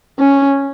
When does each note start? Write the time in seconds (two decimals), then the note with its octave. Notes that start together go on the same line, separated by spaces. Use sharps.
0.19 C#4